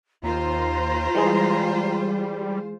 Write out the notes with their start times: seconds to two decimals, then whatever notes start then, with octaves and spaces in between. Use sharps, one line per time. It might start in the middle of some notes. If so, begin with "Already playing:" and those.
0.23 D#2 F4 C5 A#5
1.15 E3 G3 G#3 G#4